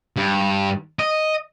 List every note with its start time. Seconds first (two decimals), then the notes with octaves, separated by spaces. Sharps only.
0.16 G2
0.99 D#5